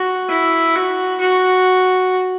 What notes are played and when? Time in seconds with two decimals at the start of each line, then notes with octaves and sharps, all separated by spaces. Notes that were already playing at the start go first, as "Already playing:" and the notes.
Already playing: F#4
0.29 E4
0.75 F#4
1.20 F#4